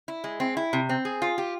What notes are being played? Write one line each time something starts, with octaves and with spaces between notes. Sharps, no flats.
E4
G#3
C4
E4
C3
C4
G#4
F4
G4